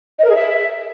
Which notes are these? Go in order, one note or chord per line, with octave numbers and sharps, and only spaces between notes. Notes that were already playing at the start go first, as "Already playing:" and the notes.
D#5
A#4
G#4
E5